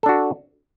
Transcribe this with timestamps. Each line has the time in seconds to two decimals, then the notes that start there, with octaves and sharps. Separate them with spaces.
0.03 A4
0.06 D4
0.09 F#4